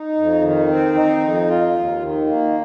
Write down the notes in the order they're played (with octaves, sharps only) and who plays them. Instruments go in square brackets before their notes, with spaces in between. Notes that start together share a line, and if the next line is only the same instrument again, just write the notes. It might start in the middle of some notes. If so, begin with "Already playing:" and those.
Already playing: [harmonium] D#4
F2
D#3
C4
D#4
F2
F4
D#2
D#3
A#3